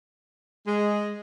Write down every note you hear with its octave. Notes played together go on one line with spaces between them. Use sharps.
G#3